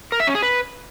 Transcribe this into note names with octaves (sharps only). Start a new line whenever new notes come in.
A#4
E5
C#4
G#4
B4